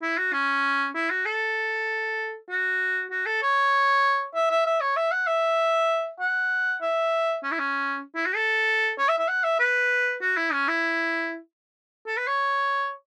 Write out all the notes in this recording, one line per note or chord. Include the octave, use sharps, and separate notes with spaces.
E4
F#4
C#4
E4
F#4
A4
F#4
F#4
A4
C#5
E5
E5
E5
C#5
E5
F#5
E5
F#5
E5
C#4
E4
C#4
E4
F#4
A4
C#5
E5
E5
F#5
E5
B4
F#4
E4
C#4
E4
A4
B4
C#5